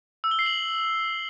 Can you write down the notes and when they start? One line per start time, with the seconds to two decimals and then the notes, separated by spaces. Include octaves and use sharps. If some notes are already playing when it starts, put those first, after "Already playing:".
0.24 E6
0.31 G7
0.39 C7
0.46 F#7